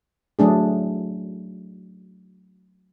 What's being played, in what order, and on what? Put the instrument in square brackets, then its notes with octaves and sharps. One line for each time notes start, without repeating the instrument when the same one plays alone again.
[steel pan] F#3 A3 D4 G#4